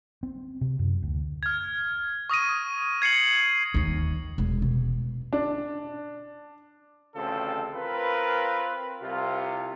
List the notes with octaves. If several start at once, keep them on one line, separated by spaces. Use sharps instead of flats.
C4
C3
F#2
D2
F6 G#6
C#6 D#6 A#6 D#7
G#6 C7 C#7 F#7
D#2 D#3
E1
B2
D4
A1 D2 C#3 F3 C4 A4
C4 F4 A#4 B4
C2 C3 F4